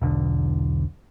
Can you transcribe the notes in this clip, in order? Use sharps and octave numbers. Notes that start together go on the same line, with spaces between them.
E1 B1 D3